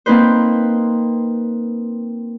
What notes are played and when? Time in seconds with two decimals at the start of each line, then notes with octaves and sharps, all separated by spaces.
0.06 A#3 C4 D#4 B4 C5